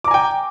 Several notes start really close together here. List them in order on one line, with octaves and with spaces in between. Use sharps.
D6 A#5 G#5 G5